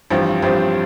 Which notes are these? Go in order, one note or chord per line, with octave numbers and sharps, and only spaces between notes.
A1 G2 F3 C4 G4
A1 G2 F3 C4 G4